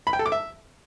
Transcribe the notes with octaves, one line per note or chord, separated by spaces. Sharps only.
B5
G5
A4
D6
E5